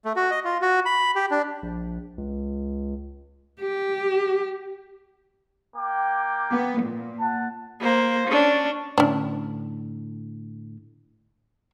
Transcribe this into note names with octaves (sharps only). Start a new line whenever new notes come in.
A3
F#4
D#5
F4
F#4
B5
G4
D4
A#1
C#2
G4
A#3 G5 D6
B3
A#2
F#5 A5
A#3 C5
C#4 D4
A2 D3 C#4 D4